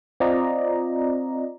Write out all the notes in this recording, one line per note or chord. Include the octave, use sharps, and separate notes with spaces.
C4 F4 D5 D#5 A#5